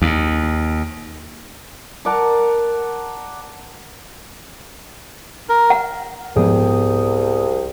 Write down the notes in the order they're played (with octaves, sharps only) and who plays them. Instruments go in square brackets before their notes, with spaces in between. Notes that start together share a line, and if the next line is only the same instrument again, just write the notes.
[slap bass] D#2
[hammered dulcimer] A#4 D5 F#5 A5
[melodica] A#4
[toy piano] F#5 A#5
[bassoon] C2 [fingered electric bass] G#2 F3 B3 [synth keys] G#4 G5 D#6